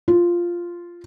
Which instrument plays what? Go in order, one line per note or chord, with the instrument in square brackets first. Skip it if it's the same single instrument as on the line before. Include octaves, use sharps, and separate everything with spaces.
[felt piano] F4